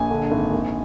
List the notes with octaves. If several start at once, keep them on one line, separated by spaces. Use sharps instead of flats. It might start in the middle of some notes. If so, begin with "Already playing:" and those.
Already playing: A#1 G#5
D3
G#1
A#1